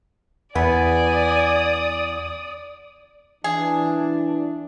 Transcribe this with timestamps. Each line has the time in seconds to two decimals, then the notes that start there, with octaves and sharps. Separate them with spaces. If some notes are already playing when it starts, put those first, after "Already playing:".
0.55 E2 B3 D5 G#5 D#6
3.44 E3 D4 G#4